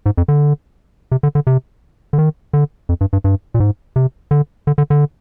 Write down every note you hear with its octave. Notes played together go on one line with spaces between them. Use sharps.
G#2
F2
D3
C3
D3
D3
C3
D3
D#3
D3
F2
G2
G2
G2
A#2
G#2
C3
D3
D3
D3
D3